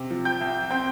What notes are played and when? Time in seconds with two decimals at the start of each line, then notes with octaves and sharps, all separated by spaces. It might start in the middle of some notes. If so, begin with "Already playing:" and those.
Already playing: C3
0.11 F3
0.25 G5 G6
0.41 C2
0.70 C4 G5 G6